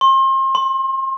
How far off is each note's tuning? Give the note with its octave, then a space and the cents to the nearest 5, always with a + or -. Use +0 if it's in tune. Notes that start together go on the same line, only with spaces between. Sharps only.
C6 +35
C6 +0